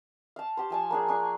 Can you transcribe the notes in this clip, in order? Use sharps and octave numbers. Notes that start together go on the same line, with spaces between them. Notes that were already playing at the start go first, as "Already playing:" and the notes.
F5 A5
G4 C5
F3 G#5 A5
A#3 D4 G#4
D4 G#4 C#6